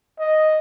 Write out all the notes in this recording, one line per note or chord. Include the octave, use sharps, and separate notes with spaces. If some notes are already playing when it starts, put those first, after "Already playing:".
D#5